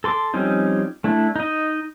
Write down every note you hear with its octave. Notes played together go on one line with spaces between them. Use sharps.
A4 C6 D6
F3 G3 C4 C#4 D#4
A3 D4 E4
D#4 D#5